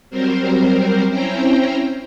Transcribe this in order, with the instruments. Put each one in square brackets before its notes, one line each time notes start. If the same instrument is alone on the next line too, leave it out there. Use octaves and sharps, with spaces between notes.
[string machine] F#3 G3 C4 A#4 C5
C4 C#4 E4 C5 G5 A#5